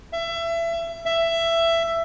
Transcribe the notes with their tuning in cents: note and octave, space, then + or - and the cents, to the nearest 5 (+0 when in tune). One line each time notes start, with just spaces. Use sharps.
E5 +25
E5 +15